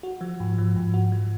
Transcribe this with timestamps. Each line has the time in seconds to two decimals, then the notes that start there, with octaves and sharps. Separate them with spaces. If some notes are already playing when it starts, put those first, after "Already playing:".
0.03 F#4
0.21 F3
0.40 G#2
0.58 F3
0.76 G#2
0.94 F#4
1.12 F3